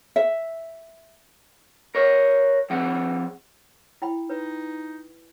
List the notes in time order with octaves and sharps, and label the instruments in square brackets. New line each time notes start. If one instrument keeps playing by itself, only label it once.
[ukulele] E5
[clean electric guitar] A#4 C#5
F3 C4 G#4 F#5
[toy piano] E4 G5 B5
[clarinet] D#4 [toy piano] B4